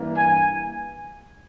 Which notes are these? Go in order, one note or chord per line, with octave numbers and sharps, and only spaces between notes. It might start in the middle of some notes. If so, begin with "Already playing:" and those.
Already playing: G2 E3 A#3
G#5